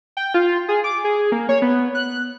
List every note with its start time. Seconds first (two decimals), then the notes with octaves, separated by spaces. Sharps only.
0.17 G5
0.34 F4
0.69 G#4
0.84 D6
1.04 G#4
1.32 A#3
1.49 C#5
1.62 B3
1.95 F#6